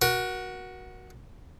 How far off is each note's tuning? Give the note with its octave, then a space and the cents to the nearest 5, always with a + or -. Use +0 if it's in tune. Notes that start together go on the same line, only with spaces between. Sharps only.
F#4 +0 A#4 +35